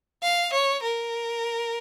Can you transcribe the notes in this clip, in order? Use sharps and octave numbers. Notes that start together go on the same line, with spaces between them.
F5
C#5
A#4